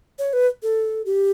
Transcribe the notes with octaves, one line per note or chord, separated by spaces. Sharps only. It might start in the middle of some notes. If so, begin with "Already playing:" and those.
C#5
B4
A4
G4